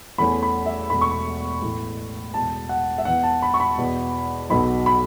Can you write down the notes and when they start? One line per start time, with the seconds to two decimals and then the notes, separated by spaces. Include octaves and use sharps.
0.18 E2 E3 A3 C#4 B5
0.43 B5
0.66 E5
0.90 E1 E2 B2 A3 B5
1.01 C#6
1.11 B5
1.62 A1 A2 E3 B3
2.34 E1 E2 B2 A5
2.69 F#5
2.98 E5
3.05 E2 E3 B3 F#5
3.23 A5
3.42 B5
3.54 C#6
3.60 B5
3.78 E2 B2 B3
4.50 B1 B2 F#3 B3 B5
4.86 B5